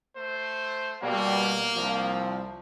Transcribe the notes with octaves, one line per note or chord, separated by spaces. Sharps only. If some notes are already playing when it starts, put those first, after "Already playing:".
A3 C5
B2 G3 A#3
C2 F3